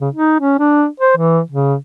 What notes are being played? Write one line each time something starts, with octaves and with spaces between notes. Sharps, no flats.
C#3
D#4
C#4
D4
C5
E3
C#3